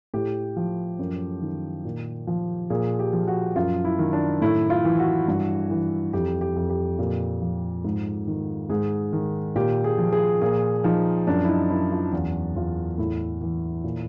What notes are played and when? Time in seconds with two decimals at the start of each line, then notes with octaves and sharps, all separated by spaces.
0.14 A2 G4
0.57 F3
0.99 F#2
1.42 D#3
1.85 A#2
2.27 F3
2.70 A#2 G#4
2.99 G4
3.13 F3
3.27 F#4
3.56 F#2 F4
3.85 E4
3.99 D#3
4.13 D4
4.42 A2 E4
4.70 F4
4.85 E3
4.99 F#4
5.28 G2
5.70 E3
6.13 F2 G4
6.41 G4
6.56 F2
6.70 G4
6.99 A#2 G4
7.42 F3
7.84 G#2
8.27 D#3
8.70 G#2 G#4
9.13 D#3
9.56 A#2 G4
9.84 G#4
9.98 F3
10.13 G#4
10.41 A#2 G#4
10.84 F3 D#4
11.27 F#2 D4
11.44 E4
11.49 D#4
11.70 F#2 E4
11.91 F4
12.12 E2
12.55 E2 F4
12.98 A2 E4
13.41 E3
13.84 A#2